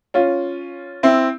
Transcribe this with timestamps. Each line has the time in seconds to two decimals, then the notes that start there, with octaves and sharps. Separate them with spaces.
0.14 C#4 F4
1.03 C4 E4